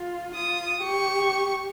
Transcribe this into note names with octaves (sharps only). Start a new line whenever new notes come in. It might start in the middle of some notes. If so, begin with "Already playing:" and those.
Already playing: F4
F4 D#6
G4 C#6